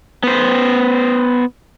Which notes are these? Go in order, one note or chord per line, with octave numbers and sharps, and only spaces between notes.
B3 C5